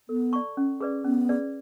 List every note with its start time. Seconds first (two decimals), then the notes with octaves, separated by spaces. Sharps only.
0.09 B3 A4
0.33 D5 A5 C#6
0.57 C#4
0.80 G#4 B4 D5
1.04 B3 C#4
1.29 G#4 B4 D5